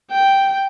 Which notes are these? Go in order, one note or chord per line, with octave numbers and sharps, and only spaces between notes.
G5